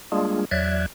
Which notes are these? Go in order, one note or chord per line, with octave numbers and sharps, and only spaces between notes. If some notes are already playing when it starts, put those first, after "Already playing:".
G3 G#3 A#3 D4 F4 G#4
E2 F#3 D5 E5 F#6 G#6